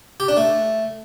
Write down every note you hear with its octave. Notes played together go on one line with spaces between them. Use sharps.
G4
D4
A3